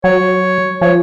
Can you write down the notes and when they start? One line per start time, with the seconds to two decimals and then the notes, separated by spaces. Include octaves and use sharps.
0.04 F#3 C#5
0.81 F3 C#5